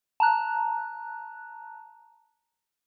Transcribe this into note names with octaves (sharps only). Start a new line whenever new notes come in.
A5 A#5 F#6